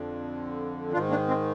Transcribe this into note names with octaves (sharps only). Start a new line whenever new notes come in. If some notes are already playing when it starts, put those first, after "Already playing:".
Already playing: F2 D3
G#2 D#3 D4 F4
A#3 D4
G#3 C4